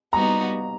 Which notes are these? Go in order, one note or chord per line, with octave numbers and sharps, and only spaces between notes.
G3 B3 D#4 F#4 A#5